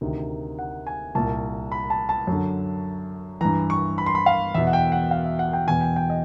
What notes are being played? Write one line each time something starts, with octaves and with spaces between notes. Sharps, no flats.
D2 C3 D#3
F#5
G#5
C2 A#2 A5
B5
A5
A5
F#2
D3
G2 E3 A#5
C#6
B5
C6
B5
F5
E2 B2 E5
F#5
G5
F#5
F5
E5
F#5
G5
E2 B2 G#5
G5
G5
D#5